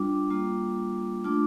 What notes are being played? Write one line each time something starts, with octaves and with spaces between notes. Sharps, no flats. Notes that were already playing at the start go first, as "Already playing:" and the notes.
Already playing: G3 D4 F4 D6
G3 A#3 F4
A3 D4 F4 D6